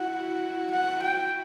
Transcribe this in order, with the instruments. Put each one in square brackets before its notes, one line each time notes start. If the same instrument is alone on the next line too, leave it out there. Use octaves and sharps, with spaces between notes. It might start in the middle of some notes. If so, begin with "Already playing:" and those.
Already playing: [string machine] E4 F#4 [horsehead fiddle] F#5
[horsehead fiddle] F#5
G5